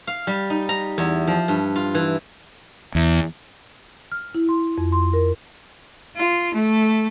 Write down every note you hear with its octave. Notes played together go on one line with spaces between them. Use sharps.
F5
G3
D#4
A#5
E2
F3
G2
F4
E3
E2
F6
E4
C6
F2
C6
A#4
F4
A3